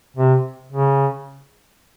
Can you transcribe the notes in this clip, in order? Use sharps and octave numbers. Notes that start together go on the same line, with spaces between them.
C3
C#3